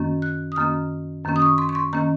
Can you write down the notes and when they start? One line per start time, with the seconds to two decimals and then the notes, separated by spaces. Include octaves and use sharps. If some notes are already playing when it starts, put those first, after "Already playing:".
Already playing: F#2 D#3 A#3 C#4
0.22 F#6
0.52 D#6
0.56 F#2 D#3 A#3 C#4 F6
1.24 F#2 D#3 A#3 C#4
1.36 D#6
1.42 C#6
1.58 C6
1.69 C#6
1.75 C6
1.93 D#3 A#3 C#4 A#5